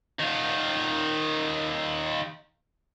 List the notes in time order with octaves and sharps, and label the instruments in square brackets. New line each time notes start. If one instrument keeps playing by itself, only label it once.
[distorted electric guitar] D#3 F4